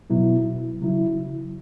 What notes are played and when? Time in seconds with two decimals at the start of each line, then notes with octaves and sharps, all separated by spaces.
0.10 B2 F#3 B3 E4
0.81 C#3 F#3 E4